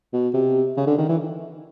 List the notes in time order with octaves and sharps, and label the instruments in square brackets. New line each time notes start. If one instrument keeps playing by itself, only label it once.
[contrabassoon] B2
C3
C#3
D3
D#3
E3